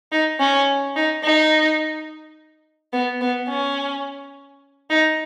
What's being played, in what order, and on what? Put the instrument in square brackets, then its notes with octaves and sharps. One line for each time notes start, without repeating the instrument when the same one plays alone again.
[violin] D#4
C#4
D#4
D#4
B3
B3
C#4
D#4